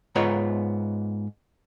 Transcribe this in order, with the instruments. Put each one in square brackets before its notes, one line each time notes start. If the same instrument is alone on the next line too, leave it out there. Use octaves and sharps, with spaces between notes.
[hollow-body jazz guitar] G#2 B3 F4 C#5 A#5